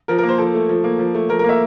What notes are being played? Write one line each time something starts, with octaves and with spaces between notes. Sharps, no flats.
F3 A#4
A#3 A#4
C5
F3 A4
A3
F3
A#3
F3
A3
F3 A#4
A#3 A#4
E5